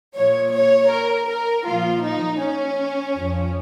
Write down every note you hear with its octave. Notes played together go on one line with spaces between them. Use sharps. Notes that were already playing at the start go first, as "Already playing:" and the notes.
A#2 F3 C#5
C#5
A#4
A#4
A#2 F3 F4
D#4
C#4
F2 F3